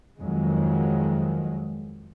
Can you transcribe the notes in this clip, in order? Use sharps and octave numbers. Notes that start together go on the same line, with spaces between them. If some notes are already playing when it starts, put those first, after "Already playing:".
F2 D#3 F#3 G#3